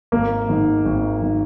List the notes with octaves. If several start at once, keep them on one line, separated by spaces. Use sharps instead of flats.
G#1 A#3
G#2 D#3
G#1
D#3